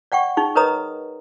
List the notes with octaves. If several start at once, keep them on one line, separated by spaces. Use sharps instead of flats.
D5 F#5 G5 C#6
D#4 G#4 C#6
A#4 B4 C#5 D#5 A#5 D#6